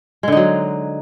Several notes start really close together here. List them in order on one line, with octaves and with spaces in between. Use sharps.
G#3 D3 D#4 F#3